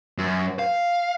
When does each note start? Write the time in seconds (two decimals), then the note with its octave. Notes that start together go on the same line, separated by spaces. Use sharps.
0.18 F#2
0.59 F5